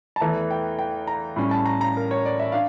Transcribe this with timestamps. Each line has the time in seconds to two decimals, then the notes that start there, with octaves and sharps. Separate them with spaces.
0.16 A5
0.20 E2 E3 A3 A#5
0.50 G5
0.79 G5
1.07 A#5
1.36 A2 G3 C#4
1.51 A5
1.66 A#5
1.81 A#5
1.97 A#4
2.11 C#5
2.26 D5
2.39 E5
2.52 D4 F5